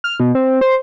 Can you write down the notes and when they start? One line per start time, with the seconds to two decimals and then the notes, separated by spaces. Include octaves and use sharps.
0.04 F6
0.20 B2
0.35 C4
0.61 C5